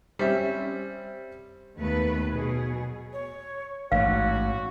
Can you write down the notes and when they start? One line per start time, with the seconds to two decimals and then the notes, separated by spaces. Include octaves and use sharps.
0.19 G3 C4 C#4 E5
1.78 D#2 A3 B3 B4
2.33 B2 F#3 G#4
3.13 C#5
3.92 A1 G#2 F#4 C#5 F5